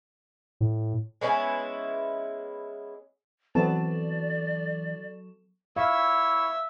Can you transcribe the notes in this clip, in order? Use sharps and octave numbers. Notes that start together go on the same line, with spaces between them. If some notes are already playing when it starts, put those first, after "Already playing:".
A2
G#3 B3 C#4 E4
E3 F#3 B3 C4 A4 D5 A5
E4 C#5 E5 F5